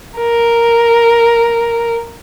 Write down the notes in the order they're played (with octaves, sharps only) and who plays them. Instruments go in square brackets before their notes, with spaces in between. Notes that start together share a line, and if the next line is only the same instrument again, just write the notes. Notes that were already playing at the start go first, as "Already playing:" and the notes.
[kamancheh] A#4